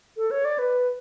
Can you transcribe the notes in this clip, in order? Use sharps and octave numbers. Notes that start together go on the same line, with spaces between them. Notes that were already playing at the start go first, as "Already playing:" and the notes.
A4
C#5
D5
B4